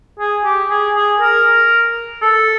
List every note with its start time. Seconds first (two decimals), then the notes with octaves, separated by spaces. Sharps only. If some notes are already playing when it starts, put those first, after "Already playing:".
0.19 G#4
0.45 G4
0.70 G#4
0.95 G#4
1.21 A#4
2.22 A4